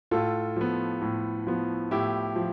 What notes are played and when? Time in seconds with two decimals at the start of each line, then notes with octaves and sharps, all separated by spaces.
0.11 A2 F4 A4
0.56 F3 B3
1.02 A2
1.47 F3 B3
1.91 A2 E4 G4
2.36 F3